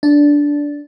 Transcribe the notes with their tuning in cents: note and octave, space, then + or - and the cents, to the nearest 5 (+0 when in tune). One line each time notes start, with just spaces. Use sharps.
D4 -10